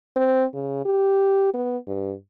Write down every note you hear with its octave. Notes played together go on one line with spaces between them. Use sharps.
C4
C#3
G4
B3
G2